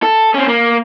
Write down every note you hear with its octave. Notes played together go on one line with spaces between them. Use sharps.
A4
C4 C#4
A#3